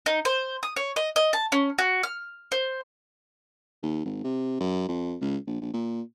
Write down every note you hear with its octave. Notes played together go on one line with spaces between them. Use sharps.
D#4
C5
D#6
C#5
D#5
D#5
A5
C#4
F#4
F6
C5
D#2
G#1
C3
F#2
F2
C#2
A#1
A#1
A#2